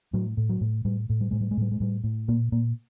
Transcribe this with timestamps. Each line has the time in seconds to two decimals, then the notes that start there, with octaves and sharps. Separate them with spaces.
0.13 A2 F#3
0.37 A2
0.49 F#3
0.61 A2
0.85 A2 G3
1.09 A2
1.21 G3
1.31 A2 G#3
1.41 G3
1.51 G#3
1.57 A2 G3
1.71 G#3
1.80 A2 G3
2.04 A2
2.28 A#2 A#3
2.52 A#2 A#3